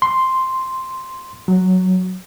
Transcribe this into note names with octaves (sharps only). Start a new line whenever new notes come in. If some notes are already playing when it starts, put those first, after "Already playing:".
C6
F#3